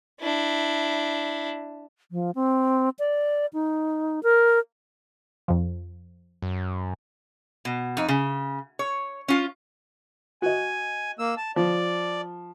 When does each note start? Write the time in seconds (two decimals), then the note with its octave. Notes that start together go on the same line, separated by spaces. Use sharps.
0.21 D4 E4
2.12 F3
2.35 C4
2.99 D5
3.53 D#4
4.23 A#4
5.48 F2 F3
6.42 F#2
7.65 B2
7.97 F2 D#4
8.08 C#3
8.79 C#5
9.28 C#4 F4
10.42 F#4 D#5 G#5
11.19 A#3 E6
11.37 A5
11.56 F3 D5